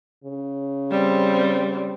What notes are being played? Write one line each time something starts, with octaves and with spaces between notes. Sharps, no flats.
C#3
G3 C4